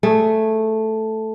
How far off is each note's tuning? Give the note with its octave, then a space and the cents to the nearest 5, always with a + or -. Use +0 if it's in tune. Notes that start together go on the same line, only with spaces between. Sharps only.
A3 +0 G#4 +0